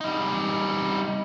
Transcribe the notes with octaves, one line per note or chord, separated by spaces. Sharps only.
G3 D#4